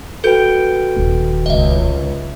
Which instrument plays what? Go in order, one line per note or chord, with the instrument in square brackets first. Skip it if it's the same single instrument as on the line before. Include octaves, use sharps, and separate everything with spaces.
[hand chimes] F#4 B4 G5 [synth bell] A4 G6 D7
[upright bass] D#1 D#3
[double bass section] C#2 [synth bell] D#5 E5